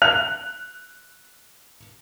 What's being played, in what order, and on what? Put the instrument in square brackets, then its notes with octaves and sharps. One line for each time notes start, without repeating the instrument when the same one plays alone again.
[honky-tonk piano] F#6 F7